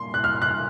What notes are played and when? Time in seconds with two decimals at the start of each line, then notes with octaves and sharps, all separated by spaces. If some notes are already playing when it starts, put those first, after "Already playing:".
Already playing: C2 A#2 C6
0.14 F#6
0.24 F6
0.42 F#6